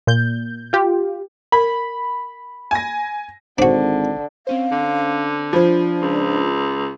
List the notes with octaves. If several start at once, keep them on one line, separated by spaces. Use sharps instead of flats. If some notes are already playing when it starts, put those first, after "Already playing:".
A#2 G6
F4 G4
A#4 B5
G#5 A#6
G#1 D3 D4 F#4 C5
C4 C#4 C5 F5
D3
F3 D4 C5 B5 G#6
C#2